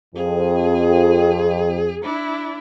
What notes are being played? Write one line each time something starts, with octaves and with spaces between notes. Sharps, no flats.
F2 G#4
D4 E4